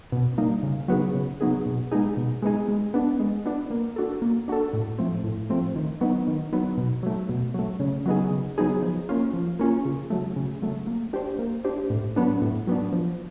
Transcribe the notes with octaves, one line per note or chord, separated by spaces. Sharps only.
B2
G3 A#3 D#4
C#3
F#3 B3 D#4 G#4
C#3
F#3 B3 D#4 G#4
B2
G#3 B3 D#4 G#4
B2
G#3 B3 D#4 G#4
G#3
B3 D4
G#3
B3 D4
A#3
D4 F#4 A4
A#3
D4 F#4 A4
A2
F3 A3 C4
A2
F3 A3 C4
D#3
F#3 B3 D#4
D#3
F#3 B3 D#4
B2
F#3 A3
B2
F#3 A3
C#3
F#3 B3 D#4 G#4
C#3
F#3 B3 D#4 G#4
F3
A#3 C#4 F4
F3
A#3 C#4 F4
C#3
F#3 A3
C#3
F#3 A3
A#3
D4 G4 C5
A#3
D4 G4 C5
A2
F#3 B3 D4
A2
F#3 B3 D4
F3